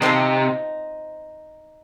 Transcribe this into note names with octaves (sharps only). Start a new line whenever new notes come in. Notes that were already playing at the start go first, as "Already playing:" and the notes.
C3 F3 C4 D#4